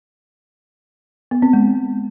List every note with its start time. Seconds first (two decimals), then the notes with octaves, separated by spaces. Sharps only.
1.31 B3
1.42 C4
1.53 G#3